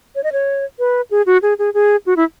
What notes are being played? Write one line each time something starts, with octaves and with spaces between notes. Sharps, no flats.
C#5
D#5
C#5
B4
G#4
F#4
G#4
G#4
G#4
F#4
E4